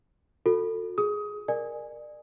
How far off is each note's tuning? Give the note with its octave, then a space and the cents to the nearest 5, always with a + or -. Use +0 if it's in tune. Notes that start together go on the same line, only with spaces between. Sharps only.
F#4 -40 A4 +20
G#4 +0 D#6 +20
A#4 +0 D5 +35 G#5 +0